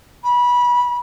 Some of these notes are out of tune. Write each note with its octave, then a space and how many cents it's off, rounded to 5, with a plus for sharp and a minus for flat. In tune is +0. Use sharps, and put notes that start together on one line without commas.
B5 -20